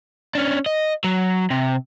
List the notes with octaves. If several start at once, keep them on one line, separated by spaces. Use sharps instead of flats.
C#4 D4
D#5
F#3
C3